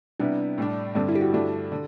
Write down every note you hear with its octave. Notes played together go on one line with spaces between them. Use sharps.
C3 G3 B3 D4 E4
A2 G3 D4
G2 D3 G3 C4 D4
E4
G4
F#4
G2 D3 A3 D4
D3